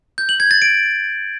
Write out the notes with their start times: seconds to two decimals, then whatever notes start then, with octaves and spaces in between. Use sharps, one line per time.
0.18 G6
0.29 F#7
0.40 G#6
0.51 A6
0.62 D7